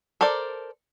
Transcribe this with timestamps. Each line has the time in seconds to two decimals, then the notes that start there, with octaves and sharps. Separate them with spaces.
0.21 A4 A#4 C5 D5